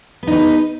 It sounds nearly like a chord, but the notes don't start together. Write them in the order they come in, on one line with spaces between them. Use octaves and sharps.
B3 D#4 B4